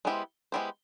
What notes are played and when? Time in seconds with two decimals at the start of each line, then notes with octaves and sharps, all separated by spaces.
0.05 G#3 B3 E4 G4 C5
0.52 G#3 B3 E4 G4 C5